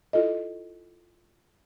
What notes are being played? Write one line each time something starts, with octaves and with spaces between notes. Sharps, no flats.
E4 F4 A4 D#5